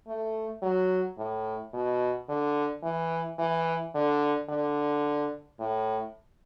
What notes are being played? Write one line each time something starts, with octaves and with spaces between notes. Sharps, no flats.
A3
F#3
A2
B2
D3
E3
E3
D3
D3
A2